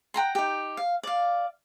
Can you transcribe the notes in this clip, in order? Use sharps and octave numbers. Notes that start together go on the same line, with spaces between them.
F#5 G5 A#5 C6
D#4 G4
F5
D5 F5